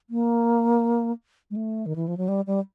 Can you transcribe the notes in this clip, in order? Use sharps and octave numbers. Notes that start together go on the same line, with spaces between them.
A#3
G#3
A3
D#3
E3
F3
F#3
G3
G3